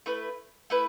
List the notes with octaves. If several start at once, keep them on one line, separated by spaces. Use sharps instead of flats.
A3 E4 B4
A3 E4 B4